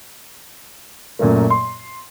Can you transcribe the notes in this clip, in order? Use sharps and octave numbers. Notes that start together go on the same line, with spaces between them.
F#2 A#2 A3 A#3
C6